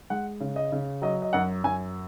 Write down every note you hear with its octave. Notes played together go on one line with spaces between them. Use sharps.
G#3 F#5
C#3
D#5
C#3
F#3 D#5
D#5
F#2 F#5
F#2 G#5